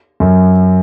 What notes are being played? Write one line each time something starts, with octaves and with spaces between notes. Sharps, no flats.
F#2